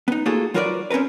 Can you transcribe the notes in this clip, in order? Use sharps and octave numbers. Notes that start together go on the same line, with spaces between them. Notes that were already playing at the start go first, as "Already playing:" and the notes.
B3 D#4
A3 A#3 F4 F#4 G#4 A4
F#3 F4 F#4 A#4 B4 D5
C4 C#4 F4 A#4 B4